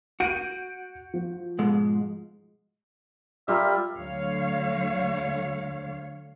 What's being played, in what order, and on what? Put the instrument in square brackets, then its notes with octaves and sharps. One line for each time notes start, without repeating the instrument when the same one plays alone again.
[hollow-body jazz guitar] F#4 [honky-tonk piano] G6 D7 D#7
[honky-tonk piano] F3
[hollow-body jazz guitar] G#2 B2 G#3
[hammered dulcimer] G3 F4 A#4 [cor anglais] E5
[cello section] D2 D3 F#3 C#5 F5